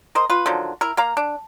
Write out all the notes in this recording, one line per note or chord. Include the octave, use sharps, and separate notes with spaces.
A#4 C5 D#5
F4 B4
D3 D#3 F3 F#3
E4 A#4
A#3 F5 A#5
D4